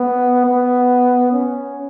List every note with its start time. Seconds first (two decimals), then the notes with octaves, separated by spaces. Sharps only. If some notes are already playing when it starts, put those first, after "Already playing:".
Already playing: B3
0.46 B3
1.32 C#4